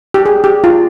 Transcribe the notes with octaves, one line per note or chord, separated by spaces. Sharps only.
G4
G#4
G4
F4